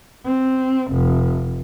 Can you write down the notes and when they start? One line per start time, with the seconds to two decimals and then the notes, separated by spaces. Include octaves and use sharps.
0.25 C4
0.92 F1